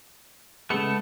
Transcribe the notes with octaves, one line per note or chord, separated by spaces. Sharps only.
C#3 G#3 A3 B3 C#7